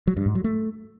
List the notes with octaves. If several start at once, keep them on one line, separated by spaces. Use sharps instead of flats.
F#3
G2
G#2
F#3
A3